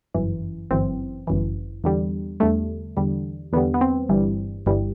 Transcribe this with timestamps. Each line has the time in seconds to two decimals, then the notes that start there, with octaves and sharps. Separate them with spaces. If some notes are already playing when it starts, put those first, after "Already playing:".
0.14 G1 F#2 E3
0.71 G1 F#2 E3 C4
1.27 G1 F#2 E3
1.84 E2 D3 G3
2.40 E2 D3 G3 A3
2.97 E2 D3 G3
3.53 E2 D3 G3 B3
3.74 B3
3.81 C4
4.09 G1 G2 E3 G3
4.66 G1 G2 E3 G3